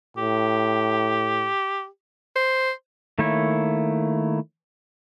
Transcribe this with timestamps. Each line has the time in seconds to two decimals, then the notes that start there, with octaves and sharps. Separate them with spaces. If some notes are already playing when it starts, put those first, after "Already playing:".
0.17 A2 G4
2.36 C5
3.19 D#3 A3 A#3 E4 C#5